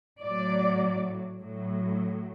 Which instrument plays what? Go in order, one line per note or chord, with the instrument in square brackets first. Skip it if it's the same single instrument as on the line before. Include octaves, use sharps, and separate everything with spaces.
[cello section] A2 F#3 D5
A2 F#3